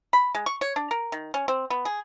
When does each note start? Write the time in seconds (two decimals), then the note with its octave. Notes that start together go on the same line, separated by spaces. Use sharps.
0.13 B5
0.35 G#3
0.46 C#6
0.61 C#5
0.76 D4
0.91 A#4
1.12 D#3
1.34 C#4
1.48 C4
1.70 B3
1.85 G#4